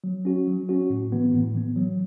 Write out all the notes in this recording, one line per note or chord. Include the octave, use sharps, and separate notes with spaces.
F#3
C#4 F#4
F#3
C#4 F#4
A2
E3 B3
A2
E3 B3
F#3